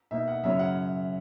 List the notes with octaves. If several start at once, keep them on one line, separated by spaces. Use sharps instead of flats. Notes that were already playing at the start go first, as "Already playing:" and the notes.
B2 A#3 D#4 E5
F#5
F#2 C#3 F#3 C#4 E4 E5
F#5